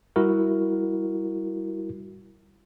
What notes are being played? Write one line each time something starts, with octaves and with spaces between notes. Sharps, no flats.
G3 E4 F#4 A#4